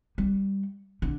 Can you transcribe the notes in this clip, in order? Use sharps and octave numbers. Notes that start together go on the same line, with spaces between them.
G3
D3